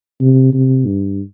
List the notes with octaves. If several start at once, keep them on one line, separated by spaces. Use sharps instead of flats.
C3
C3
G2